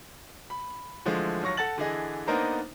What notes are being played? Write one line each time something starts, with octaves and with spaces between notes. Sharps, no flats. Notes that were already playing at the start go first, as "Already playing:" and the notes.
B5
D3 E3 F3 G#3 A3
D#2 F#3 C#6 A#6
A4 F#5 A5 A6 F#7
D3 E3 G#4 D#5
A#3 B3 D4 D#4 A#4 C5